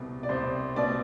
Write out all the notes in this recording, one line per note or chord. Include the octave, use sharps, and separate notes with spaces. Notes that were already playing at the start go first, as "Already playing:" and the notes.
Already playing: C2 B2
D5
C2 C5
B2 D5